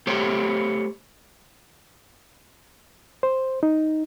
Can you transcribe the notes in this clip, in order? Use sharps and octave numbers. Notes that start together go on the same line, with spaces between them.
A3 G4 C5 C#5
C5
D#4